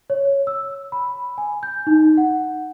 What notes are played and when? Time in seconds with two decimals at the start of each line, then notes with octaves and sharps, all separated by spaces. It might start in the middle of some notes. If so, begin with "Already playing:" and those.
0.10 C#5
0.47 E6
0.92 B5
1.38 G#5
1.63 G6
1.87 D#4
2.17 F#5